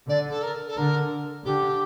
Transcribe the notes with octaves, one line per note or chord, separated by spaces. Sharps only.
D3 D5
A4
A#4
A4
D3 A#4
D3 G4